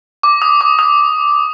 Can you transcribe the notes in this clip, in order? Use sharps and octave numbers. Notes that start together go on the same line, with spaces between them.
D6
D#6
D6
D#6